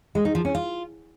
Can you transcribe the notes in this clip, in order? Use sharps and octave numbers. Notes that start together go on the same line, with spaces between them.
G#3
D#4
F3
C#4
F4